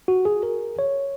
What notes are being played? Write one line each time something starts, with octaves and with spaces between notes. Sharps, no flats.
F#4
G#4
A#4
C#5